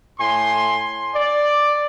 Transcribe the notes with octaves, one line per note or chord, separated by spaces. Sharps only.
A2 G#5 C6
D5